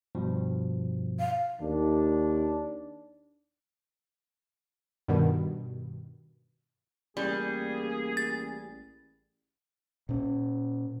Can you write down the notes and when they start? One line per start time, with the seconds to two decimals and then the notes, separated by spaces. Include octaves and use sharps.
0.15 G2 B2 F3
1.19 F5
1.61 D#2 D#3 D4
5.08 G2 B2 D#3
7.17 A1 G3 A#3 G#4
8.17 A6
10.09 A#2 C#4